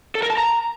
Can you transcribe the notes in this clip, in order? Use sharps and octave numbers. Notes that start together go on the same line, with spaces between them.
A4
A#4
A5
A#5